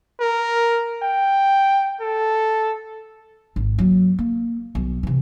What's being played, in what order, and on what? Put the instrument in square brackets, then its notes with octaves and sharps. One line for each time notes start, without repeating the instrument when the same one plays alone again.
[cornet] A#4
G5
A4
[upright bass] G#1
F#3 A#3
A#3
B1 G3
C3 E3